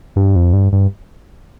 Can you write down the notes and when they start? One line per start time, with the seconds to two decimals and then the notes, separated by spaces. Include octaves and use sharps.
0.16 G2
0.36 F2
0.53 G2
0.73 G2